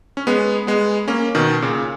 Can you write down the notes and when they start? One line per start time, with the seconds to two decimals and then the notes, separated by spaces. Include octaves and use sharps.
0.17 C#4
0.27 G#3 B3
0.67 G#3 B3
1.08 A#3 C#4
1.35 B2 D#3
1.62 A#2 C#3